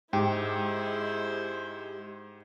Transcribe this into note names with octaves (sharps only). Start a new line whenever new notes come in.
G#2 G#3 E4 G4 C5